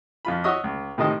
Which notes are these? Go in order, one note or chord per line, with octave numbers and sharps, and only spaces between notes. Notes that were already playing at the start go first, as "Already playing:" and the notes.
F2 F4 B5
F#4 C#5 D#5 E5 D#6
C#2
A2 C3 D#3 D#5 A5